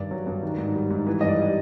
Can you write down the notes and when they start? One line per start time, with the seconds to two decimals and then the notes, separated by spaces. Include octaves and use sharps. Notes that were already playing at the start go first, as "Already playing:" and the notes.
Already playing: G2 D#3 D5
0.11 F#3
0.27 G2
0.43 D#3
0.58 G#2
0.75 G3
0.90 G#2
1.07 E3
1.21 G2 D#5
1.28 D5
1.38 G3